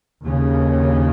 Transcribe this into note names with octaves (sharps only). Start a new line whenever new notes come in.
D#2 C#3